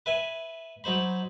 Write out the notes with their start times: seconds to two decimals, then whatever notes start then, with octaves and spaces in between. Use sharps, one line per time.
0.06 B4 E5 G#5
0.84 F#3 D#4 C5 B5